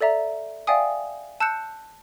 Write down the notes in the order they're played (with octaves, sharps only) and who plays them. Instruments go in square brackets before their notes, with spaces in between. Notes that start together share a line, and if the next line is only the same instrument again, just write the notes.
[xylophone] A4 D5 E5 A#5
D5 E5 F5 G5 G#5 D#6
A5 E6 F#6 G6 C#7 E7